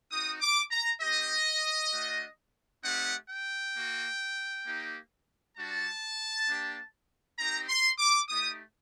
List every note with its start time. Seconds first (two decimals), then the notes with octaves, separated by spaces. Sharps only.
0.10 C4 D#4 F#4 D#6
0.41 D6
0.71 A#5
1.01 C4 D#4 G4 D#5
1.93 A3 D4 F#4
2.83 A3 C4 D#4 G4 F#5
3.29 G5
3.75 A#3 F#4
4.65 A#3 D#4 G4
5.57 G3 D4 F#4 A5
6.47 A#3 D4 G4
7.38 C4 D#4 G4 A#5
7.69 C6
7.99 D6
8.29 A3 D#4 G4 D#6